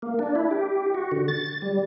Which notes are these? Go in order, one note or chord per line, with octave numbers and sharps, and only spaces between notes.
A#3
D4
E4
G4
F#4
D3
A6
G3